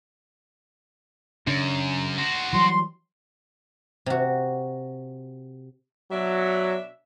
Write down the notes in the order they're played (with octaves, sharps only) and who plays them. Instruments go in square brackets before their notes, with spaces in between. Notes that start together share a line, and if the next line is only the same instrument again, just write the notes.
[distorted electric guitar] F#2 [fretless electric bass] C#3 D4
[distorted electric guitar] F#4 C5
[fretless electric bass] E3 F#3 G3 [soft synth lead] C6
[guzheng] C3 F#4
[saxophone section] B2 D4 E5 [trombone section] F#3